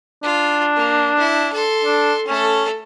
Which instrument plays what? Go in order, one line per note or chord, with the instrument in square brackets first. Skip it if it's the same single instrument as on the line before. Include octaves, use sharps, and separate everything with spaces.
[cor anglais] D4 [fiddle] F4
[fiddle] A#3
E4
A4 C6
[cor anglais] D4
[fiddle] A3 A4 [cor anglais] C#4